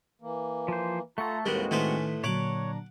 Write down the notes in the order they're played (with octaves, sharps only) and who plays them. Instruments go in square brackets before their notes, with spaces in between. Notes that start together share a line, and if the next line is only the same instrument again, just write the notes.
[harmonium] E3 A#3
[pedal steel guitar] F3 C5
[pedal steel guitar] A3 A4 [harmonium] F4 A#5 [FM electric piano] F#5 C#6
[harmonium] D#2 A2 B4 [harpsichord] D#3 G3 [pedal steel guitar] G#3 C4 F#4
[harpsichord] A2 B3 C5 [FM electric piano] D#3 [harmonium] C#4
[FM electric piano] A#2 D3 F#3 [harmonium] D4 A#5 [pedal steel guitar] C#5 [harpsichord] F#5 D6